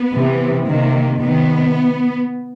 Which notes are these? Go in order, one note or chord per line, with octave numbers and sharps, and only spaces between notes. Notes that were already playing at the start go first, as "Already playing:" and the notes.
Already playing: B3
C3 E3
C3 D#3 A#3
C3 D#3 B3